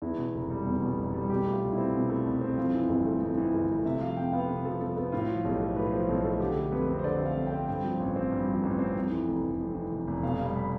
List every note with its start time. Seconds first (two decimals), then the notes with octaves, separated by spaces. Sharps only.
0.02 E2 E4
0.18 B2
0.35 F1
0.50 G3
0.66 E2
0.82 B2
0.98 F1
1.14 G3
1.30 B2 G4
1.46 A3
1.51 F4
1.62 C2
1.73 E4
1.78 C4
1.94 B2
2.09 A3
2.25 C2
2.41 C4
2.57 F2 F4
2.74 E3
2.89 G1
3.05 A3
3.21 F2
3.38 E3
3.53 G1
3.69 A3
3.85 C3 E5
4.01 F3 F5
4.16 F2 G5
4.32 B3 F5
4.48 C3 B4
4.64 F3 A4
4.81 F2 A4
4.97 B3 A4
5.12 A2 F4
5.28 F3
5.45 B1 G4
5.60 A3
5.76 A2 B4
5.92 F3 C5
6.09 B1
6.24 A3 A4
6.40 D3 G4
6.56 A3
6.72 F2 B4
6.88 C4
6.99 C5
7.04 D3 D5
7.20 A3
7.26 F5
7.36 F2
7.46 G5
7.52 C4
7.68 G2 G5
7.84 F3
8.00 A1
8.16 C4
8.32 G2
8.47 F3
8.63 A1
8.79 C4
8.95 F2
9.11 E3
9.28 F1
9.43 F1
9.59 F2
9.75 E3
9.91 F1
10.07 F1
10.23 B2 F5
10.38 G3 F5
10.55 B5